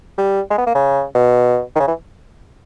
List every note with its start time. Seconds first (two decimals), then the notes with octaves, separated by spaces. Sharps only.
0.18 G3
0.50 G#3
0.58 B3
0.66 A#3
0.75 C#3
1.15 B2
1.76 D#3
1.80 C#3
1.88 E3